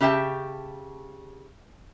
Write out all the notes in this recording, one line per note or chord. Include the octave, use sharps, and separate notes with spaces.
C#3 G4 E5 G5 A5